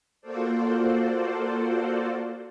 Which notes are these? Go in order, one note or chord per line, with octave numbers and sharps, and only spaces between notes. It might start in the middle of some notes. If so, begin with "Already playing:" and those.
A#3 F4 F#4 A4 C5 D5